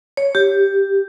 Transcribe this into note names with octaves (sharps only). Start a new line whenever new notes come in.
C#5
G4